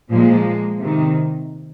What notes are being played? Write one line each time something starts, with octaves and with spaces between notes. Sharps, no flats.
A#2 F3 G#3 A#3
C3 D#3